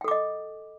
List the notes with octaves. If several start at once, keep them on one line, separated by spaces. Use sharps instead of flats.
A4 D#5 G5 D6